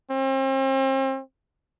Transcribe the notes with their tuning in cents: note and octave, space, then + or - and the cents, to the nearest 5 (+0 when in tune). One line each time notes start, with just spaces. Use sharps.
C4 +40